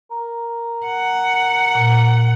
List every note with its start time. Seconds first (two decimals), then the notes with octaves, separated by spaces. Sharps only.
0.11 A#4
0.86 F#5
1.75 A#2